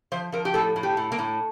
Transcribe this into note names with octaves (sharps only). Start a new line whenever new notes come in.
F3 C5
F3 A#4
G4
A2 A4
A2
G4
A2
A#3
A2